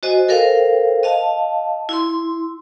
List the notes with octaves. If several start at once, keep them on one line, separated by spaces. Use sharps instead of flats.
F#4 C5 D#5 G#5
A4 A#4 C5 F5 G5
D#5 F5 A5
E4 C6